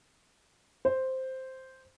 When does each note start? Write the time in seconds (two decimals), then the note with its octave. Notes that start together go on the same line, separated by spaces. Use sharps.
0.85 C5